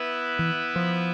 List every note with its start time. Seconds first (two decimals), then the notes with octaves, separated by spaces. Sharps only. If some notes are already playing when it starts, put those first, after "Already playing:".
Already playing: B3 E4 B4 E5
0.39 E3
0.76 F3